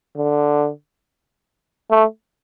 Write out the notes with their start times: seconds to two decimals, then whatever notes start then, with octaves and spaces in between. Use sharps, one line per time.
0.17 D3
1.91 A3